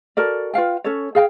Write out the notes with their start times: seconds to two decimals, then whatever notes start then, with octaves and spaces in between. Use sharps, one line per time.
0.17 F#4 A4 A#4 D5
0.54 F4 B4 F5 G5
0.84 C#4 A4 C#5
1.15 G#4 F5 G5